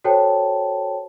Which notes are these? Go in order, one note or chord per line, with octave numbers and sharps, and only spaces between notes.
F#4 A4 C5 C#5 G5 A5